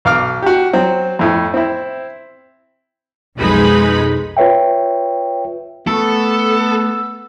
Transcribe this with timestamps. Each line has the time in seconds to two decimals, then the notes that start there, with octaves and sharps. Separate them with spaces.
0.05 B1 F5 D6 F6
0.42 F#4 G4
0.73 F#3 C4
1.19 F2 A2
1.54 C4 E4
3.36 B1 F2 G#3 D#4 B4 B5
4.37 F4 B4 C#5 E5 G5
5.87 A3 B3 A4 C#6 E6